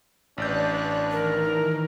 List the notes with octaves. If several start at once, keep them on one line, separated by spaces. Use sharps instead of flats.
A1 D4 B4 C#5 D5 F#6 G6
D#3 E3 A#4